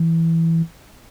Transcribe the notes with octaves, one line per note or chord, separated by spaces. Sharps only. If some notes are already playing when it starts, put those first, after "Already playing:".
Already playing: E3